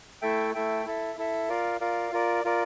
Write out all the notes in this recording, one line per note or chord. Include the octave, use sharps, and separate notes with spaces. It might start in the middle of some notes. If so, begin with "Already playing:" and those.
A3 E4 A4 E5 G5
A3 E4 A4 E5 G5
E4 A4 E5
E4 A4 E5
F4 A#4 D5 F5
F4 A#4 D5 F5
F4 A#4 D5
F4 A#4 D5